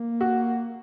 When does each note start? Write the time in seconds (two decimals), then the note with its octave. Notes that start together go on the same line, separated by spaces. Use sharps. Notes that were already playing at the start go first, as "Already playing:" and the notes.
Already playing: A#3
0.21 F#4